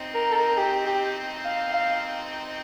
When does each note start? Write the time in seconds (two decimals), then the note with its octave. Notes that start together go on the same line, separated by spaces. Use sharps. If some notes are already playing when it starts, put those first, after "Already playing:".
Already playing: C4 D#4
0.14 A#4
0.31 A4
0.35 A#4
0.58 G4
0.86 G4
1.45 F5
1.74 F5